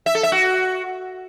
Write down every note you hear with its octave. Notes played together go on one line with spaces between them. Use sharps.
E5
A4
E5
F#4